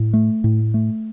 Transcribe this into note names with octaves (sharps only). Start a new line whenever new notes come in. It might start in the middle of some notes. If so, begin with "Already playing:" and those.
Already playing: A2
A3
A2
A3